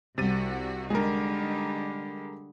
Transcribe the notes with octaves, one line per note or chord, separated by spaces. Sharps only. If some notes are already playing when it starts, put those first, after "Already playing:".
C2 C3 F#4 A6 D#7
D3 G3 G#3 D#4 G#4 A#4